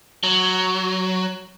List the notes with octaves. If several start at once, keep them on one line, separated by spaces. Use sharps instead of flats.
F#3